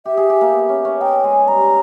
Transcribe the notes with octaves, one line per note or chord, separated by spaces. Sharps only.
G4 E5
G#4
G4
A#3
B3
C#4
C#4
D#4 G5
G#3 G#5
G3 A#5